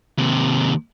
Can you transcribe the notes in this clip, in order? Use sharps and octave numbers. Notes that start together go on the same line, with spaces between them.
D#2 C3